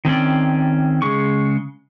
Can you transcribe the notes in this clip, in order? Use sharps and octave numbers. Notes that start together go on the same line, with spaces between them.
D#3 C4 C#4 D5
C#3 G#3 C#6